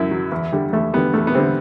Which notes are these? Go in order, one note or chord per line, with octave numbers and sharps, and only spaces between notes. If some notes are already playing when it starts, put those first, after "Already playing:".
Already playing: F#2 E4
F#3
E2
D3 G3
E2 A3
D3 G3 B3
E2 A3
B3
D3 G3 C4